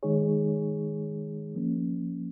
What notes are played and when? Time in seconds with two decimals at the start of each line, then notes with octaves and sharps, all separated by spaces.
0.03 D#3 G#3 D#4 G#4 C#5
1.55 F3 A#3 C#4